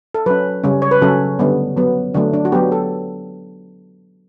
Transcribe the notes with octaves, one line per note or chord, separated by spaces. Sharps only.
A4
F#3 C#4 B4
C#3 G3 C#4
C#5
B4
C#3 F#3 C#4 A4
D3 G3 B3
F#3 B3
D3 F#3 A3 D4
D4
F#4
F#3 B3 G4
A4